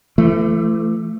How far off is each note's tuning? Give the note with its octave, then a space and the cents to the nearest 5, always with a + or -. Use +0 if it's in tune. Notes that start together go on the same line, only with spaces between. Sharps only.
E3 +40 A3 +0